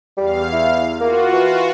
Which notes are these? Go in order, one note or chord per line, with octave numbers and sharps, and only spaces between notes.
E2 G3 F5
E4
A#3 F4 F#4
E3